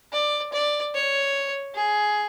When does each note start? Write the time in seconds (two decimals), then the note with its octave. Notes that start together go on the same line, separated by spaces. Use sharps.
0.13 D5
0.53 D5
0.94 C#5
1.75 G#4